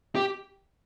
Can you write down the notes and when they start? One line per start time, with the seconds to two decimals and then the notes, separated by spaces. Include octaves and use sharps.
0.15 G4